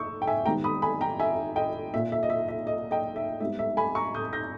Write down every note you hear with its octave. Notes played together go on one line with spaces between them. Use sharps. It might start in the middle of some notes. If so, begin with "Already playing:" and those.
Already playing: A#2 C#6 D#6 E6 G6
G5
E5 G#5
G#2 D#3 G3 B3 G5 A#5
B5 D#6
G#5 B5
G5 A#5
E5 G#5
D#5 G5
A#2 A#3 E5
E5
D#5
E5
E5
D#5
D#5 G5
E5
G#2 G3 B3 E5
E5
G#5 B5
A#5 C#6
D#6 G6
G6 A#6